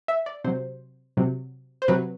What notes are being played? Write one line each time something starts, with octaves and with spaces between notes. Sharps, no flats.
E5
D5
C3 F#3 C5
C3 F#3
C5
C3 F#3 B4